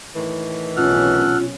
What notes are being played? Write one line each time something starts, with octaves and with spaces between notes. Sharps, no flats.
A2 D#3 E3
B1 C3 C#4 F4 A4 F#5 F6